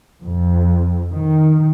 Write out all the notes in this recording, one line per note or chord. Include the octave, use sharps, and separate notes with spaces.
F2
D#3